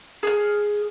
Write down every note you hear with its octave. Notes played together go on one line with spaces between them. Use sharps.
G#4 F6